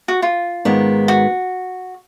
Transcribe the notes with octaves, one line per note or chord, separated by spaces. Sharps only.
F#4
F4
G#2 D#3 G#3 B3
F#4